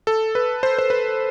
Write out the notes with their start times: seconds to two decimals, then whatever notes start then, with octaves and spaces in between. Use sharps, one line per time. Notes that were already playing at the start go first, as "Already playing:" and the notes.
0.07 A4
0.35 B4
0.63 C5
0.79 C5
0.90 B4